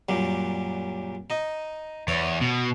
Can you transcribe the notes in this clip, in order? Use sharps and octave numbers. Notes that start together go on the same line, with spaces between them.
F#2 A#2 G3
D#4 D#5
E2 C#5
B2